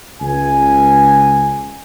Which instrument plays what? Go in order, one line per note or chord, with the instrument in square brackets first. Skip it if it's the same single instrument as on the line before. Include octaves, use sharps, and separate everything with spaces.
[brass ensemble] C#2 G#5